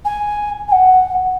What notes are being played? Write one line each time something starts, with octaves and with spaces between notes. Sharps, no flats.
G#5
G#5
F#5